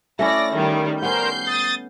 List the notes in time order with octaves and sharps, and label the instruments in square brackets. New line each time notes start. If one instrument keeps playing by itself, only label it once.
[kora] A3 C#4 E4 [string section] D5 A#6
[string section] D#3 G3
[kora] B3 C#4 [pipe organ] A#4 C5 [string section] G6 C7
[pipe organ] D#6 A6